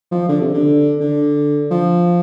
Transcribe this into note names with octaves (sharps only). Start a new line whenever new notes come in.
F3
D3
C3
D3
D3
F3